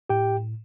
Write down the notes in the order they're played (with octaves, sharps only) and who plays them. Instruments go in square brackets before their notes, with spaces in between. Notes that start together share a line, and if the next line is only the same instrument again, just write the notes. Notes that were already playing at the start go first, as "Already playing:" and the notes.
[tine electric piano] A2 G4 G5